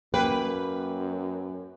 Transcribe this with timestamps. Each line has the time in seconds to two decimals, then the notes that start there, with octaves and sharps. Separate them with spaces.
0.14 F#2 A#3 B4 G5